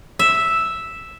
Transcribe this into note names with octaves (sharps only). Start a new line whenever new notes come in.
E5